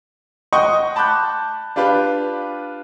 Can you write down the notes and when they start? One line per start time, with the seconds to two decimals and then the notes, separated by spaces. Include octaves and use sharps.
0.53 D#5 F#5 G5 C6 C#6 D#6
0.96 A5 B5 D6 F#6 G6
1.76 D4 F4 G4 B4